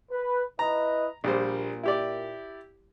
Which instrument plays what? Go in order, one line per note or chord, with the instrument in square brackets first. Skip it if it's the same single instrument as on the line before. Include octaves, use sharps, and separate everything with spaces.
[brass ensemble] B4
[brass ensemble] E4 B4 D#5 [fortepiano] A#5
[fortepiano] A#1 G3 C5 [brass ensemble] A#2
[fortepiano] E4 G4 D5